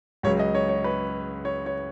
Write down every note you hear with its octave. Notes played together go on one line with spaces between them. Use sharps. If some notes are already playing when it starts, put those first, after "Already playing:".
C#2 C#3 F#3 C#5
D#5
C#5
C#5
B4
C#5
C#5